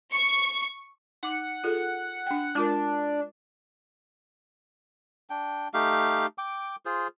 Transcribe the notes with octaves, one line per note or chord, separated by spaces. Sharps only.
C#6
D#4 F#5 D6
F4 G#4 A4
D4 G5
G#3 D4 F4 A#4
D4 G5
A3 D#4 G4 F5
G5 D6
F4 G#4 C5